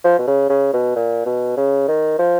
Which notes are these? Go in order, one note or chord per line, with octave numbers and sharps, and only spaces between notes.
F3
B2
C#3
C#3
B2
A#2
B2
C#3
D#3
F3